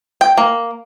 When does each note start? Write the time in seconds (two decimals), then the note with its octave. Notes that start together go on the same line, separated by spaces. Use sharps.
0.21 G5
0.37 A#3